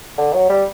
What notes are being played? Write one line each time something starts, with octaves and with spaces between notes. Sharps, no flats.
D3
F#3
G3